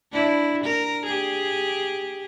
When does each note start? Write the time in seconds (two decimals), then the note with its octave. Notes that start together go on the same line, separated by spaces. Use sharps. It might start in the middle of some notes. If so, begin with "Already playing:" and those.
0.12 D4 E4
0.64 A#4
1.06 G4 G#4